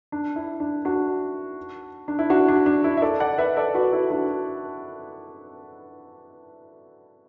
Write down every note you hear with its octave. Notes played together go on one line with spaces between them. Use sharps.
D4
E4
D4
D4 F#4
D4
E4
D4 F#4
D4
D4
E4
E5
A4 D5
D5 F#5
B4 E5
A4 D5
F#4 B4
E4 A4
D4 F#4